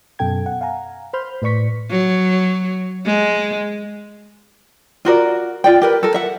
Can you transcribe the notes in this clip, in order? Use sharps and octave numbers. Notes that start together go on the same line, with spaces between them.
F#2 B2 A4 G5 G#6
F#5
F5 F#5 G#5 A#5
C5 B5 C6 F6 G6
A2 B4 D5 C#6 B6
F#3
G#3
F4 F#4 A#4 D5
F4 D5 G5
G4 A#4 B4
A4 A#4
E5 F#5